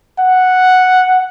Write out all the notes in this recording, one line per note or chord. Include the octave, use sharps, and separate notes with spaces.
F#5